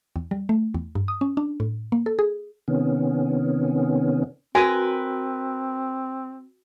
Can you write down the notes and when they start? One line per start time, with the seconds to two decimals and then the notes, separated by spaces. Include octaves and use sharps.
0.16 E2
0.31 G3
0.49 A3
0.74 E2
0.95 G2
1.08 D#6
1.21 C#4
1.37 D4
1.60 A2
1.92 A#3
2.06 A4
2.19 G#4
2.68 C3 D#3 B3 C#4
4.55 C4 F#4 A#4 B4 G#5